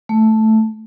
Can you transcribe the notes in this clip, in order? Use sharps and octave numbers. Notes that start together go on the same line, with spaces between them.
A3